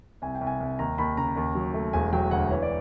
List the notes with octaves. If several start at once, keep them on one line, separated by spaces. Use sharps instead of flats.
C2 G#5
G5
C2
G#5
C2
D#2 A#5
D#2 B5
C#3 A#5
D#2
F#3
A3
E1 G#5
F#3 G5
D2 F#5
E3 C#5
D5